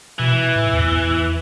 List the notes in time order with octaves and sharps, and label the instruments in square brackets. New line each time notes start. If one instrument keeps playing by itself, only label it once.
[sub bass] B2 [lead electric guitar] E3
[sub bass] A2
E2
E2